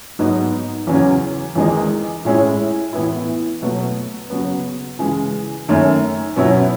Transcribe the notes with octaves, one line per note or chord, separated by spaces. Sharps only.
G#2 F#3 B3 D#4
E2 C#3 F#3 C#4
E2 D#3 G#3 D#4
A2 G#3 C#4 E4
A2 E3 B3 E4
B2 F#3 A3
C#3 F#3 B3
C#3 E3 G#3
F#2 D#3 A3 C#4
B2 F#3 C#4 E4